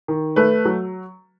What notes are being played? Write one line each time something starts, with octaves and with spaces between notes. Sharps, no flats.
D#3
A3 B4
F#3